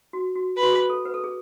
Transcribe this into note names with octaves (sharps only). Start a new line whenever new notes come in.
F#4
F#4
B4
F#4
G#4
A4
B4
A4
G#4